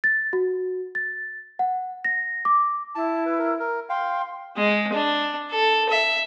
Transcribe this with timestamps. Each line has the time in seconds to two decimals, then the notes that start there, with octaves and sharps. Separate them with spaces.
0.04 A6
0.33 F#4
0.95 A6
1.59 F#5
2.05 A#6
2.45 D6
2.95 E4 A5
3.26 B4
3.39 A#4
3.59 A#4
3.90 F5 G5 C6
4.56 G#3
4.93 D4
5.51 A4
5.89 E5